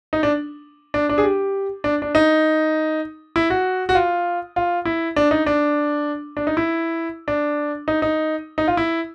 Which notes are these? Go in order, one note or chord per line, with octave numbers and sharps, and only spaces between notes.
D#4
D4
D4
D4
G#4
G4
D4
D4
D#4
E4
F#4
F#4
F4
F4
E4
D4
D#4
D4
D4
D#4
E4
D4
D#4
D#4
D#4
F4
E4